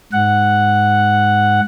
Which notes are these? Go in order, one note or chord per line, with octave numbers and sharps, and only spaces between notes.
G#2 F#5